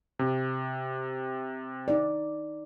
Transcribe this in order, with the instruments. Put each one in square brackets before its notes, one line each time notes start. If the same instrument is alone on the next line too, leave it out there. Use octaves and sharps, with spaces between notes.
[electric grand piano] C3
[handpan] D#4 D5